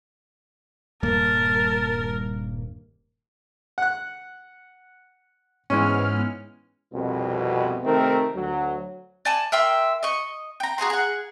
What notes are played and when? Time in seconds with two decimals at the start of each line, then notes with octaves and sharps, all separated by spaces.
1.03 D#1 G2 A#3 A#4 A5
3.78 F#5 F#6
5.70 G#2 E3 G#3 B3 C#4 F6
6.93 C2 F2 B2
7.84 C3 D#3 A3 C4 A#4
8.35 D2 F#3
9.25 D5 G#5 A5
9.52 A#4 E5 G5 C6
10.03 D#5 C#6
10.60 G5 A#5
10.78 F#4 G#4 A#5 C6
10.90 G#4 F#5